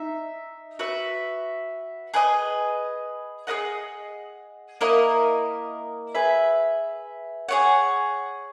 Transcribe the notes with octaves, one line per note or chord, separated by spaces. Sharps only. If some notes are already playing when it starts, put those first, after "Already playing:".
Already playing: D#4 E5
F#4 B4 E5
G#4 B4 D#5
G#4 B4 D#5 F#5
A#3 E4 A#4 D#5
G#4 B4 E5
G#4 C#5 F#5